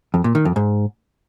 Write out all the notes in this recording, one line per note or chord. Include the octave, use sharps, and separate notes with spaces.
F2
A#2
D#3
F2
G#2